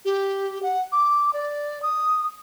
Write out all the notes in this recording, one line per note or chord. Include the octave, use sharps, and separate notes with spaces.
G4
F#5
D6
D5
D#6